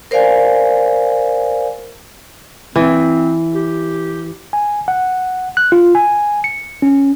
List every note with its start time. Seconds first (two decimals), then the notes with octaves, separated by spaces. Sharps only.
0.11 A#4 C5 D5 F5 G#5
2.76 E3 C4
3.55 G4
4.53 G#5
4.88 F#5
5.57 F#6
5.72 F4
5.95 G#5
6.44 C#7
6.82 C#4